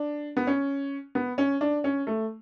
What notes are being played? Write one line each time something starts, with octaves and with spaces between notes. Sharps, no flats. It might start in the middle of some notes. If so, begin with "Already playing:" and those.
Already playing: D4
B3
C#4
B3
C#4
D4
C#4
A3